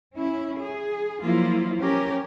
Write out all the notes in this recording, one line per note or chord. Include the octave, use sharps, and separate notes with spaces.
C#4 E4
G#4
F3 F#3 A#3 E4 F4
C#4 G4 A#4